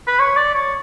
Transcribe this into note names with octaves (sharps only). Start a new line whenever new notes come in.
B4
C#5
D5
C#5